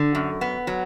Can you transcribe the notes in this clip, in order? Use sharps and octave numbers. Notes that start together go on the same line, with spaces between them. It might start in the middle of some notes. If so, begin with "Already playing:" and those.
Already playing: D3
F#2
B3
F#3